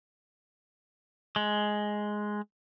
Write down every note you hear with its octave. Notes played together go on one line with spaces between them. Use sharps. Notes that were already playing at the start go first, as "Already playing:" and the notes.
G#3